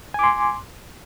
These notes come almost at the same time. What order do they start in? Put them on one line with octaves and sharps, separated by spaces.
G#5 D6 C6